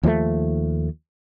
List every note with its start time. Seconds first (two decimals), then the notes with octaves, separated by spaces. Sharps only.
0.03 D#2 F3 G#3 A3